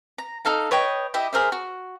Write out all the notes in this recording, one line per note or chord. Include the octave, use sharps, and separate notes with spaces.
A#5
D#4 A4 F5 A#5
B4 C#5 D#5 G5
E4 G4 D#5 E5
G#4 A#4 C5 E5
F#4